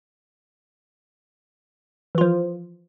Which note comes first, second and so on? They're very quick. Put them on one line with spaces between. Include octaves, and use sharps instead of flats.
E3 F4 F3